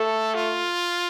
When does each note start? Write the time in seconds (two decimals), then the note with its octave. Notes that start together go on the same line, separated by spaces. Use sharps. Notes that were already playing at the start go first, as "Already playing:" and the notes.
Already playing: A3 A4
0.35 F4